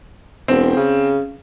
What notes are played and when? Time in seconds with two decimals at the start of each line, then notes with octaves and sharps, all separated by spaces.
0.48 E1 C4
0.77 C#3